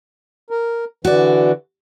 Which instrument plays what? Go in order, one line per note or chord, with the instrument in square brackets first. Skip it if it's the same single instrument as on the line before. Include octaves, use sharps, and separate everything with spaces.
[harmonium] A#4
[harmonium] D3 E3 [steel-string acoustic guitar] F#4 D5